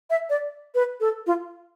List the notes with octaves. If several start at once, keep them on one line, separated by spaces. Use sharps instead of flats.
E5
D5
B4
A4
F4